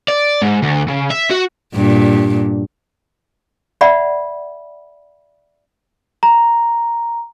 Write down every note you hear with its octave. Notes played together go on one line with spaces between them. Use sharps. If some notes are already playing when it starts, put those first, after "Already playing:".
D5
G#2
D2
C#3
E5
F#4
G2 A#2
D5 E5 F#5 B5
A#5